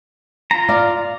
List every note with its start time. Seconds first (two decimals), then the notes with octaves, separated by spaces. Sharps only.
0.51 F4 A#5
0.69 D5 F5